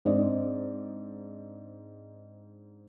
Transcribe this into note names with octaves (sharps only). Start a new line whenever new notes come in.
G#2 C4 D4 D5 D#5